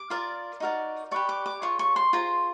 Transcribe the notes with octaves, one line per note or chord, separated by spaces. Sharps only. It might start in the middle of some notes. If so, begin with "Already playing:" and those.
Already playing: D6
F4 A#4 D5
D#4 F#4 A#4 D5
G4 B4 D5 C#6
D6
D6
F4 G#4 C#5 C#6
C#6
C6
F4 G#4 C5 A#5